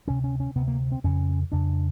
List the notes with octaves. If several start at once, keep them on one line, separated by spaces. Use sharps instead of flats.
D2 C3 C#4
C#4
C#4
D2 C3 B3
A#3
C4
F2 C#3 C#4
F2 C#3 D4